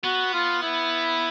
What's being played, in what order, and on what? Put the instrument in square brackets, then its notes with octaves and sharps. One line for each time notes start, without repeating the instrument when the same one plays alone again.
[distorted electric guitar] B3 [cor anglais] F#4
[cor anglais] F4
E4